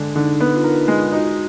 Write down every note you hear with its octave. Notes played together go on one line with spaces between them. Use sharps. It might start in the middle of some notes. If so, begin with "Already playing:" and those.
Already playing: D3 G#3
D3 D#4
B3 D#4
F4
D#4 A#4
G#3 F4
D#4 F#4
F#4